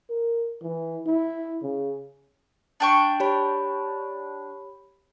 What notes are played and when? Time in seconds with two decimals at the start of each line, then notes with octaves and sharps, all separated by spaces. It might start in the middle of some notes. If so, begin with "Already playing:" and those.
0.10 A#4
0.63 E3
1.07 E4
1.63 C#3
2.80 D4 G5 C#6
3.20 G4 C#5 B5